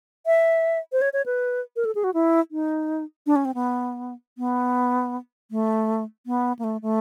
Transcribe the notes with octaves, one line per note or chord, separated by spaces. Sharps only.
E5
C5
C#5
C#5
B4
A#4
A4
G#4
F#4
E4
D#4
D4
C#4
C4
B3
B3
A3
B3
A#3
A3
A3